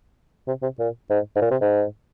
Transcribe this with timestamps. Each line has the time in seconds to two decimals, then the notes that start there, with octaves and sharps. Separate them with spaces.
0.47 C3
0.62 C3
0.79 A#2
1.10 G#2
1.35 G#2
1.42 A#2
1.51 C3
1.61 G#2